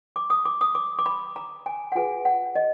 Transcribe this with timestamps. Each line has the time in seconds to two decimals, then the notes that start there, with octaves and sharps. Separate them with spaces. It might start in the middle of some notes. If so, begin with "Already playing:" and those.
0.16 D6
0.30 D#6
0.45 D6
0.61 D#6
0.75 D6
0.99 D6
1.06 B5
1.36 A#5
1.66 G#5
1.92 F#5
1.95 F4 G#4 B4 G#5
2.25 F#5
2.55 D#5